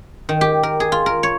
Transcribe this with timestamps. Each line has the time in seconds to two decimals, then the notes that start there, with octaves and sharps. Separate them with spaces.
0.29 D#3
0.41 G4
0.63 A#4
0.80 G#4
0.92 F4
1.06 A#4
1.23 C#5